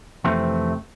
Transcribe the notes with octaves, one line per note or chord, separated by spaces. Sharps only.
F2 C3 E3 A3 C4